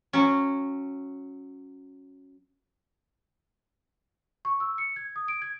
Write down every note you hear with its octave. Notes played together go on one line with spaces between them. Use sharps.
F#3 C#4
C#6
E6
C#7
G#6
D#6
D7
G#6